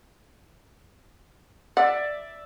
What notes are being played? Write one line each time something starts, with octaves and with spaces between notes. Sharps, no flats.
D5 E5 F#5